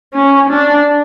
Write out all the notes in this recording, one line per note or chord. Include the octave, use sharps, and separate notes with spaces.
C#4
D4